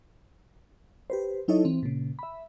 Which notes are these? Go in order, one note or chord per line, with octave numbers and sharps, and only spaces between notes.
G4 B4 C5
F#3 D#4 E4 A4 C#5 D#5
E3 C4
A#2 C#3
E5 B5